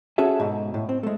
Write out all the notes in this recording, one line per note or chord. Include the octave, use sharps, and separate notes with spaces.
C#4 F#4 G#4 A4 E5
G#2 B2
A2
C4
G#3 A3